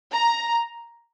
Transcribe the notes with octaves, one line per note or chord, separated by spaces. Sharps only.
A#5